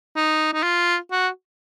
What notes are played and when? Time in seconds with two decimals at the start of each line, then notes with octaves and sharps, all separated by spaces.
0.16 D#4
0.53 D#4
0.63 F4
1.11 F#4